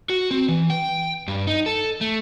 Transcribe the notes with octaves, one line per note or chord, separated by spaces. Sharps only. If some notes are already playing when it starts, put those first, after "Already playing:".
F#4
C4
E3
G5
G2
D#4
A4
A3